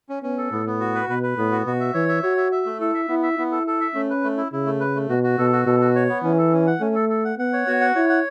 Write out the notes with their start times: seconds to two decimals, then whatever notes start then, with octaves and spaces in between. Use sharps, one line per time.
0.09 C#4
0.23 B3 C#4
0.38 A4
0.51 A2 B3
0.66 B3
0.80 F#4
0.95 B4
1.09 B2 B4
1.23 B4
1.38 A2 B3
1.52 F#4
1.66 B2 F#4
1.80 E5
1.94 E3 C#5
2.08 E5
2.23 F#4 C#5
2.37 E5
2.52 E5
2.66 A3
2.80 E4 A4
2.94 E5
3.08 B3 E4
3.23 E5
3.38 B3 E4
3.52 A4
3.67 A4
3.81 E5
3.94 A3 C#4
4.10 B4
4.24 A3
4.37 E4
4.52 C#3 E4
4.66 A3
4.80 B4
4.96 A3
5.09 B2 F#4
5.23 F#4
5.38 B2 A4
5.52 F#4
5.66 B2 A4
5.81 F#4
5.95 C#5
6.09 B3
6.23 E3 C#4
6.38 A4
6.52 C#4
6.67 F#5
6.80 A3 C#4
6.95 A4
7.09 A4
7.25 F#5
7.38 B3 F#5
7.53 C#5
7.67 B3 F#4
7.81 F#5
7.95 E4 C#5
8.09 F#5